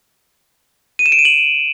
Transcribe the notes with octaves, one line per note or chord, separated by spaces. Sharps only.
D#7
E7
D7
D#7
F#7